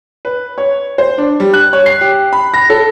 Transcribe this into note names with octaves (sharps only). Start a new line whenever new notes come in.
B4
C#5
C5
D4
G3
F#6
C#5
C7
G4
B5
A#6
A4